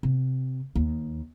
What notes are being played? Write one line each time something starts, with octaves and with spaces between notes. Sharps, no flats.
C3
D#2